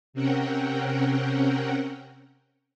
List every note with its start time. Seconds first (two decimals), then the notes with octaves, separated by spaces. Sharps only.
0.13 C3 C4 C#4 A#4 F#5 G5